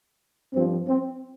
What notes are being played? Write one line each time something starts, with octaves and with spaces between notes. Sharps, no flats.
G2 F3 C4
C4